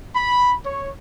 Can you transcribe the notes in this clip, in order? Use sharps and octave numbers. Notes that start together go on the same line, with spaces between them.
B5
C#5